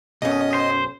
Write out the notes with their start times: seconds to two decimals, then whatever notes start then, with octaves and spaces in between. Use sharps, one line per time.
0.22 B1 F#2 C#4 D#5
0.54 C5